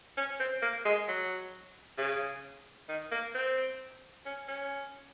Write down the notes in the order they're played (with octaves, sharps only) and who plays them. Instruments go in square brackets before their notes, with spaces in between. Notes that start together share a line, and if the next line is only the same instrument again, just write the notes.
[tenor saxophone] C#4
C4
A#3
G#3
F#3
C#3
D#3
A#3
C4
C#4
C#4